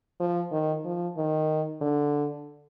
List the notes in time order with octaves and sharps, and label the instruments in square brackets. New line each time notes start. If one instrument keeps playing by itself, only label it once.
[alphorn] F3
D#3
F3
D#3
D3